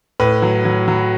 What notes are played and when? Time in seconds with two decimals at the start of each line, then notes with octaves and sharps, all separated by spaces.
0.20 A2 B4
0.42 F#3
0.65 F#3
0.88 F#3